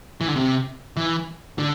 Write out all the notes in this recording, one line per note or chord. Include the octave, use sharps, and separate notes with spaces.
E3
D3
C3
E3
D3